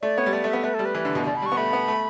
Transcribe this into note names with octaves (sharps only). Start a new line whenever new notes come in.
A3 D5
B3 C#5
G3
A3 D5
A3
B3 E5
A3 B4
A4
G3
B4
E3
D3
B2
B2 D5
B5
G3 C#6
B3
A3 B5
B3
A3